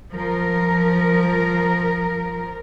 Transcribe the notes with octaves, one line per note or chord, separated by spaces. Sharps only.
F3 A#4